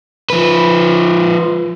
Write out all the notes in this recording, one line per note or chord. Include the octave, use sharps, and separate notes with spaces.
F3 B4